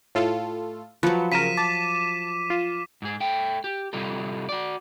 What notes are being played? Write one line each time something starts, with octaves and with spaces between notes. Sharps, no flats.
A2 F4 A4
F3 F#3 B4 C#7
C#3 A#4 B6 D#7 E7
A5 D6
F4
G#2 G#4
A3 G5
G4
C3 G3 D#4 F4 A4
F#4 D5